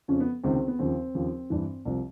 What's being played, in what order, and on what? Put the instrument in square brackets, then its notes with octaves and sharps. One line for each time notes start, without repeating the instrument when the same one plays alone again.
[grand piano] F2 C#3 F3 C#4
B3
C#2 C3 D#3 C4
C4
B3
D#2 C#3 F3 C4
D#2 C#3 F3
G2 E3
C2 C3 F3